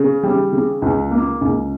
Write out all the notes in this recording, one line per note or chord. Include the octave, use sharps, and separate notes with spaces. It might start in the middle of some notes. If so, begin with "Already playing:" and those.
Already playing: C#3
G3
C#3
C#2
A#3
C#2